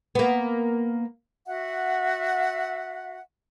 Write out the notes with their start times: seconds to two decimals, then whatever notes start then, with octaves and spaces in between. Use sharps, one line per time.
0.15 A#3 B3
1.46 F#4 E5 F#5